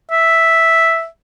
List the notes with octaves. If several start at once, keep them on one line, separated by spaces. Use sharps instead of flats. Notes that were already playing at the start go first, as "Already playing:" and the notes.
E5